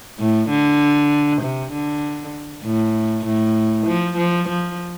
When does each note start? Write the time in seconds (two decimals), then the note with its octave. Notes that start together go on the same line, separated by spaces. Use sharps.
0.20 A2
0.49 D3
1.42 C3
1.73 D3
2.64 A2
3.25 A2
3.87 F3
4.17 F3
4.48 F3